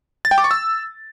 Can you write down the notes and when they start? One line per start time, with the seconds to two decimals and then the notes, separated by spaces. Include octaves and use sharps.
0.25 A6
0.31 G5
0.38 D6
0.44 C#6
0.51 E6